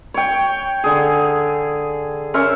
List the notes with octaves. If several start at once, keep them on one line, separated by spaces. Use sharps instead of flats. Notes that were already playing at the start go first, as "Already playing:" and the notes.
C#5 G5
D3 G#4
C#4 A#4 C5 E5